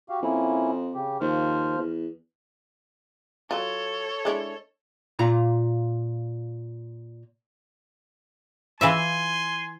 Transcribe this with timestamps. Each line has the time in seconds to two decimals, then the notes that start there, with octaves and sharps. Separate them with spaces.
0.09 F#4 G4 F5
0.22 F2 A#3 C#4 E4
0.94 C#3 G4
1.21 D#2 F3 C5 F6
1.78 E2
3.51 F#3 F4 A4 C#5
4.25 G#3 D4 E4
5.19 A#2 F4 A#5
8.81 E3 F4 E5 G#5 C6